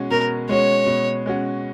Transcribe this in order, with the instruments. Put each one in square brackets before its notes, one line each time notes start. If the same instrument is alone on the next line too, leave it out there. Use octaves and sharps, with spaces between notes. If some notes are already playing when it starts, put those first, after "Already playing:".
Already playing: [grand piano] B2 G#3 C#4 F#4
[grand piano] B2 [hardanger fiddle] A#4
[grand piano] G#3 C#4 F#4 [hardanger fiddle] C#5
[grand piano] B2
G#3 C#4 F#4